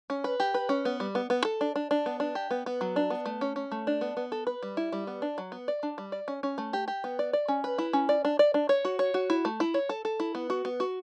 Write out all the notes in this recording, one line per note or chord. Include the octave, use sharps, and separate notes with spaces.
C#4
B4
G4
B4
C#4
B3
G3
B3
B3
A4
D4
D4
D4
B3
D4
G4
B3
B3
F#3
D4
B3
A3
C#4
C#4
A3
D4
B3
B3
A4
B4
G3
E4
G3
B3
D4
F#3
B3
D5
D4
G3
D5
C#4
C#4
A3
G4
G4
B3
D5
D5
C#4
B4
E4
C#4
D5
D4
D5
D4
C#5
F#4
C#5
F#4
E4
A3
E4
C#5
A4
A4
E4
B3
F#4
B3
F#4